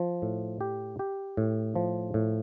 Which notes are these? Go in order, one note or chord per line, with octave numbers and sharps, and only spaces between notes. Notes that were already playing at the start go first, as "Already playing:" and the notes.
Already playing: F3
A2
G4
G4
A2
F3
A2